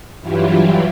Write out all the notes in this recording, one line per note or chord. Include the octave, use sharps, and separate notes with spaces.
G2 E3 F#3 E4 F4 G4